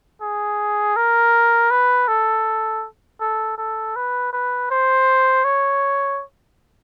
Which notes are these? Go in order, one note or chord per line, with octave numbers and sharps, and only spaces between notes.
G#4
A#4
B4
A4
A4
A4
B4
B4
C5
C#5